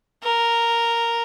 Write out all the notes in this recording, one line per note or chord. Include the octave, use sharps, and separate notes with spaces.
A#4